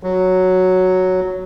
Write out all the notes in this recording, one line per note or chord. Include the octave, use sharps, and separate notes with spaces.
F#3